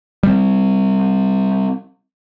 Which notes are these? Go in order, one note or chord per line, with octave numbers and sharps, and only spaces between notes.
G3 C4